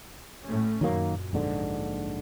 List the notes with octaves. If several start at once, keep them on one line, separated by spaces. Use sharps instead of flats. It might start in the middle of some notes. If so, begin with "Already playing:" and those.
A2 A3 C#4
F#2 A#2 D#3 F#3 A#3
A#1 G#2 D3